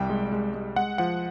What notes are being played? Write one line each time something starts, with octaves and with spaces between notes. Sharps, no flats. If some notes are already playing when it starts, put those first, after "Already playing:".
Already playing: C2 G3 G5
G#3
G#3
G#3
G#3 F#5
F3 F#5